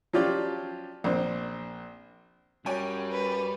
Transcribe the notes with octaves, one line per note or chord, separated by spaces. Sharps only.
F3 F#3 C#4 F4 G4 D5
A#1 C4
F#2 G3 C#5 G5 G#5
B4